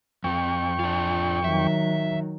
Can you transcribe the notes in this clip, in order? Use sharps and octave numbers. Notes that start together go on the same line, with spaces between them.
F2 F3 C4 G5 C#6
D4 F4
D#3 F#3 E5